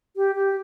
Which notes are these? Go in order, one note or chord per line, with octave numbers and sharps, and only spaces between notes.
G4
G4